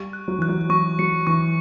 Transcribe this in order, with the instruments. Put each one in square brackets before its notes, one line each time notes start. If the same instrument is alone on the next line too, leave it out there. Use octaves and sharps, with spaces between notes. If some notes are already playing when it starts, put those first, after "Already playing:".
Already playing: [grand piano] G3 [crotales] C#6
[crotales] F#6
[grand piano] F#3
[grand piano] E3 [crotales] F#6
[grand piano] F#3
[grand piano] F#3 [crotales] C#6
[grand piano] F#3 [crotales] C#7
[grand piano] E3 [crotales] C#6